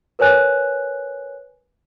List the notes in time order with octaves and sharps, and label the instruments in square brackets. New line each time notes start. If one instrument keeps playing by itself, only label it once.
[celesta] A#4 B4 C#5 G#5 F#6